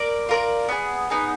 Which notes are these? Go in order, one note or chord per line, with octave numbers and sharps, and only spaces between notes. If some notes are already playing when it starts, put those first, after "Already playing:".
Already playing: A#4 D5
F4 A#4 D5
B3 D#4 G#4
B3 D#4 G#4